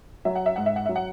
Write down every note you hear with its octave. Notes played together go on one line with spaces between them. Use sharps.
F#3 E5
F#5
E5
G#2 F#5
E5
F#5
F#3 E5
F#5